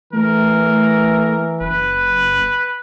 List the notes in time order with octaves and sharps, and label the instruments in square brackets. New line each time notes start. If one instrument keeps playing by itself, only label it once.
[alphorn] E3 [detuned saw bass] A3 [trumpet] A#4
[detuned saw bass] F#1 [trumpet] B4